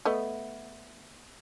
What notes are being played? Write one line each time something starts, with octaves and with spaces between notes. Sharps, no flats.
A3 B3 D#5